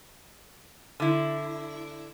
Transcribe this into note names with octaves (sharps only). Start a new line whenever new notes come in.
D3 E4